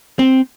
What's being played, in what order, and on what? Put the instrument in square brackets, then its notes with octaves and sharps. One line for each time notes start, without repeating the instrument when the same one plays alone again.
[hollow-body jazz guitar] C4